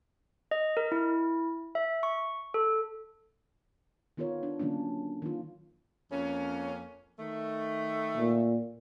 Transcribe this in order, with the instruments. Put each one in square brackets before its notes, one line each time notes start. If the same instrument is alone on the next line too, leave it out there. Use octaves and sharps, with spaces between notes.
[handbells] D#5
A#4
E4
E5
C#6
A4
[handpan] D#3 B3 F4 A#4 C#5
D4
D3 F#3 A#3 C#4 D4
D#3 A#3 F4
[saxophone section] F2 A#3 C#4
D#3 A3
[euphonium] A#2